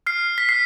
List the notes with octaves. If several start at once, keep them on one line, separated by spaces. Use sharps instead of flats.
F6 C7
B6
F6 C7